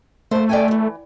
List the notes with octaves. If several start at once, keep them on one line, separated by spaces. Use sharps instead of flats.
A3 A#3 C5
D5 G5 G#5
D2 E3